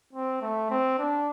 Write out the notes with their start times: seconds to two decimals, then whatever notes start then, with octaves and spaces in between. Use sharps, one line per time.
0.13 C4
0.41 A3
0.70 C4
0.99 D4